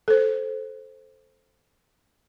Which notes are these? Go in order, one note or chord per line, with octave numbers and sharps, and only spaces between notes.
A4 C5